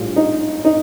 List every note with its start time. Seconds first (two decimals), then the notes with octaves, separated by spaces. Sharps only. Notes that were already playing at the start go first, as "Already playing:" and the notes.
Already playing: A#1 A2 G3 F4
0.16 D#4
0.65 D#4